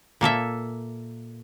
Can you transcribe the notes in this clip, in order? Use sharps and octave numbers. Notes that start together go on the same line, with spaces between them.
A#2 A#3 A4 E5